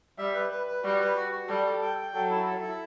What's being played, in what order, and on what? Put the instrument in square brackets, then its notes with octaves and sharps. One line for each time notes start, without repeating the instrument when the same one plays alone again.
[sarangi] G3 [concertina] E5
[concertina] B4
B4
B4
[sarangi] G3 [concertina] F#4
[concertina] B4
F#4
F#4
[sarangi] G3 [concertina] A4
[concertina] A4
G5
G5
[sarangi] F#3 [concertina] A4
[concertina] E4
A4
E4